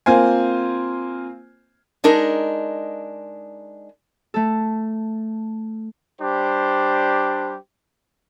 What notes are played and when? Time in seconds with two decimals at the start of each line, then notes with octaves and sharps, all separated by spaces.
0.06 A#3 C4 F4 C5 G#5
2.04 G#3 D4 D#4 A#4
4.34 A3 A4
6.21 G3 D4 G4 C5